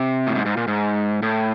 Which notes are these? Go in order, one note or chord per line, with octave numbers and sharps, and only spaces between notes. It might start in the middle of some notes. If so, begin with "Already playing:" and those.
Already playing: C3
A2
G#2
G#2
A#2
G#2
A2